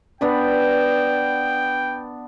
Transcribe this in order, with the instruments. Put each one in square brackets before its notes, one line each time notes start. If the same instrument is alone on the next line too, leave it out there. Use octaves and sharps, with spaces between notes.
[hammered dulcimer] B3 D4 B5 [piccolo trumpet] G5